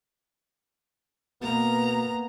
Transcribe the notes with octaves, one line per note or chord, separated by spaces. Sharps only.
B2 A#3 B3 A#5